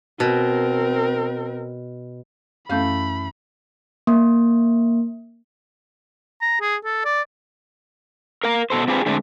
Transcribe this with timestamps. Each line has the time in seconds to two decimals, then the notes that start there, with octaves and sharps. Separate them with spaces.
0.20 B2 C4 A#4
2.69 F#2 E3 A3 C#4 F5 B5 G6
4.07 A#3
6.41 A#5
6.61 G#4
6.84 A4
7.05 D5
8.44 A#4 F5 A#5
8.70 B2 A4 C5
8.88 C4 D4 F4 G4 G#4 B4
9.06 D3 G#3 A3 C4 D4